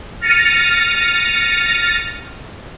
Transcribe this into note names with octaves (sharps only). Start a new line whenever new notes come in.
F6 A6 A#6 C#7 D#7